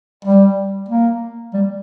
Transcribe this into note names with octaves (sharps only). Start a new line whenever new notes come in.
G3
A#3
G3